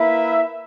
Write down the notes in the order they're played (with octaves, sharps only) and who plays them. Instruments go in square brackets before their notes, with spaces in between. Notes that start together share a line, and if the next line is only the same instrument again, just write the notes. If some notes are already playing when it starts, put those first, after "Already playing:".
Already playing: [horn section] A#3 E4 B4 E5